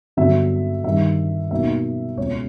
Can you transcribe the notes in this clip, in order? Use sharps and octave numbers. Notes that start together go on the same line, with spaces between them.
G2 D3 F#3 B3 E5
G2 D#3 G3 E5
B2 F#3 A#3 D#4 E5
C#2 B2 G#3 C#5